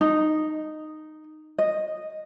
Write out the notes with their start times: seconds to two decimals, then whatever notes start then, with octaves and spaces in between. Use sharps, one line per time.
0.01 D#4
1.58 D#5